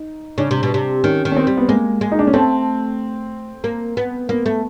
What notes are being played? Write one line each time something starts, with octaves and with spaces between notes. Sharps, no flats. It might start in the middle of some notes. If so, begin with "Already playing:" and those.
Already playing: D#4
C#3 D4
C3
B2
C3
D#3 C#4
D#3
C#4
C4
G3
B3
G#3 A#3
G#3
D#4
D4
C#4
A3 C4
A#3
B3
A#3 B3
A3